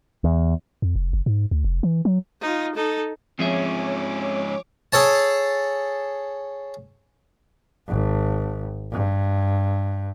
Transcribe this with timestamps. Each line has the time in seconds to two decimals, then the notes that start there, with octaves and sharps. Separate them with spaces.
0.24 E2
0.82 F2
0.96 F1
1.13 F#1
1.26 G#2
1.51 D2
1.65 F1
1.83 E3
2.05 F#3
2.41 D#4 F4
2.75 D#4 A4
3.39 G#2 F3 C4 C#4 G#4 C#5 E5 D6
4.93 G#4 A4 C#5 A5
7.88 G#1
8.92 G2